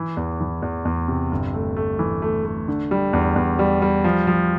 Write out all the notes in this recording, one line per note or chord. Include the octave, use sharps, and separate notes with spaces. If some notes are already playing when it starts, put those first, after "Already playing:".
Already playing: E3
E2
E3
E2
E2
C3
G1
A3
A3
E3
A3
A3
D3
G3
E2
E2
G3
G3
F3
F3